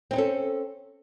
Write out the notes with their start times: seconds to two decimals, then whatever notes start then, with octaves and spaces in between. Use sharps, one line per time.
0.11 C4
0.13 D#4
0.16 C#4
0.18 A4